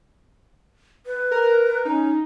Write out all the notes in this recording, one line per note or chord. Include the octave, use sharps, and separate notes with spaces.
B4
A#4
C#4 D#4